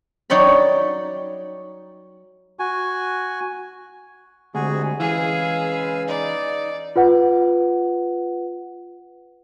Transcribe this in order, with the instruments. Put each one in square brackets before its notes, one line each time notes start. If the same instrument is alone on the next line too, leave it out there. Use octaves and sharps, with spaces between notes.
[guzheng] F#3 D#4 C#5 D5 G5 B5
[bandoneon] F#4 G#5
[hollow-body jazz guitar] D2 [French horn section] C3 G3 G#3 [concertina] F#4 G#4
[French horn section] C#3 G#3 B4 [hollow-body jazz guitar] E3 [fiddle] G#4 [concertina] F5 G#5 E6
[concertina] D#4 [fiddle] D5
[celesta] F4 B4 F#5